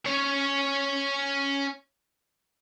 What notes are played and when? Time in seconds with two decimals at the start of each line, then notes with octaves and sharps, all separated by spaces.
0.07 C#4 C#5